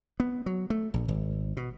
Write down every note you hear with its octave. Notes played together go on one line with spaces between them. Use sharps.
B3
F#3
A3
A#1
G#1
B2